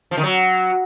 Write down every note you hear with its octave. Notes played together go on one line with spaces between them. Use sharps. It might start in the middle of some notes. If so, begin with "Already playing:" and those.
F3
D#3
F#3